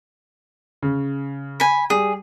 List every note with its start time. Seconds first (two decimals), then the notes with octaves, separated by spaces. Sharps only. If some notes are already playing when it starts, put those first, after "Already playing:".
0.82 C#3
1.60 G#5 B5
1.90 G3 G#4